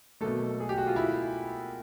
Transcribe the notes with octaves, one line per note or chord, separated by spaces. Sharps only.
B2 F#3 A3 A#3 A4
G#4
G4
F#4
F4
E4